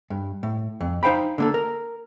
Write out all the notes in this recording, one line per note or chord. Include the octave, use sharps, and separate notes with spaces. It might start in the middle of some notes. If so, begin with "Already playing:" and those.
G2
A2
F2
D#4 C5 F5 G5 B5
D3 A#3 A4
A#4